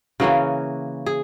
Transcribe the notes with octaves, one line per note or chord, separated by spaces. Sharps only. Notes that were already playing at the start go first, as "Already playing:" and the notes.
C#3 E3 A#3 C#4 F#4
G#4